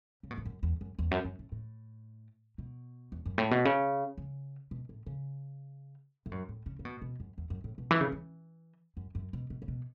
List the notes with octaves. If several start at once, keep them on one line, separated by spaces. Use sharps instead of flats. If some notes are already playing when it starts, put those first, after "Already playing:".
C#3
B2
A2
F#2
E2
F#2
E2
F#2
F#2
A2
A2
B2
E2
F#2
A2
B2
C#3
C#3
B2
A2
C#3
A2
F#2
A2
C#3
C#3
B2
B2
F#2
E2
F#2
A2
B2
E3
C#3
E3
F#2
F#2
B2
B2
C#3
B2